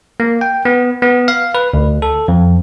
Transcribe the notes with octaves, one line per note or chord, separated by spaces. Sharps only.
A#3
G5
B3
B3
F5
B4
D2
A4
F2